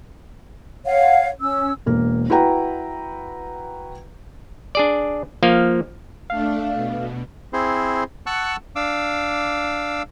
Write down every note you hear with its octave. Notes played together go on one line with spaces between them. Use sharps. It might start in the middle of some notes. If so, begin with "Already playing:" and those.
C#5 F5 F#5
C#4 E6
E1 A#3
E4 F#4 B4 G5 A#5
D4 G#4 D5
F3 A#3 F5
A3 D4 F5
B2
C4 E4 G#4 C5
F#5 A5 C#6 E6 F#6
D4 F5 D6 E6